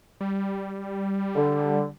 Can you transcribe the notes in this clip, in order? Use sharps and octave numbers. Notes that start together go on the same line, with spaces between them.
G3
D3